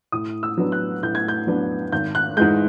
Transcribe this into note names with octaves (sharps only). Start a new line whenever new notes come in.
A2 D#6
E6
F#3 B3 D4
F#6
A2 G6
G#6
G6
F#3 B3 D4
G#1 G6
F#6
G#2 E3 G#3 G6